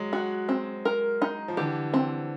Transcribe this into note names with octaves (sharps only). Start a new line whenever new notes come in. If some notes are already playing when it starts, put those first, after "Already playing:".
Already playing: F#3 G#3
F#4
C4
A#4
D#4
F3
D3 E3 G4
C4